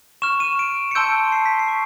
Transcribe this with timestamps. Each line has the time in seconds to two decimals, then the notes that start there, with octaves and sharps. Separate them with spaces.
0.22 C#6 F6 E7
0.40 D#7
0.59 D7
0.91 C#7
0.95 A5 C6 E6 G6 D7
1.32 C7
1.46 B6
1.59 C7
1.68 C#6